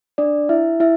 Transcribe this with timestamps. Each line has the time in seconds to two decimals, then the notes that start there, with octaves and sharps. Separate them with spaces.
0.18 D4 D5
0.49 E4 E5
0.80 E4 E5